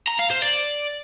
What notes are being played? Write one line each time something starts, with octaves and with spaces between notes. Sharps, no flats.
A#5
F5
C5
D5